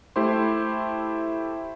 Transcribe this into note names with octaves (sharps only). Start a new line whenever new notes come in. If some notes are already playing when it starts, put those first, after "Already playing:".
A3 E4 G4 C5 C6